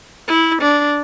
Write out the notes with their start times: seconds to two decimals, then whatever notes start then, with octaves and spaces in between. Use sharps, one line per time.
0.28 E4
0.62 D4